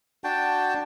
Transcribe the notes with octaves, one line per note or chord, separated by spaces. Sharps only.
D4 F#4 G5 A5